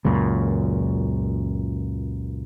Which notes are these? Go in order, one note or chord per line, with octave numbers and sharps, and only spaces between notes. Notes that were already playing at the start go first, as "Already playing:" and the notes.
C#2 F#2 A#2